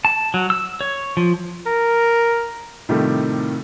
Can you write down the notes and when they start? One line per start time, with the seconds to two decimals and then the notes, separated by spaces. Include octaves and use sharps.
0.05 A5
0.34 F#3
0.50 E6
0.81 C#5
1.17 F3
1.66 A#4
2.89 A2 C3 D#3 F3 G3 A3